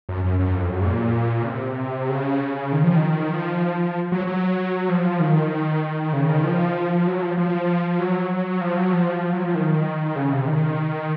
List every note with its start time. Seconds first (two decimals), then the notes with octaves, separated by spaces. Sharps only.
0.09 F#2
0.24 F#2
0.39 F#2
0.55 F2
0.70 F#2
0.81 G#2
0.87 A#2
1.42 C#3
1.48 C3
2.09 C#3
2.72 D#3
2.84 F3
2.96 D#3
3.34 F3
4.12 F#3
4.27 F#3
4.89 F3
5.20 D#3
6.13 C#3
6.29 D#3
6.44 F3
7.07 F#3
7.22 F3
7.38 F3
7.99 F#3
8.61 F3
8.77 F#3
8.93 F3
9.33 F#3
9.43 F3
9.55 D#3
10.16 C#3
10.32 C3
10.47 D#3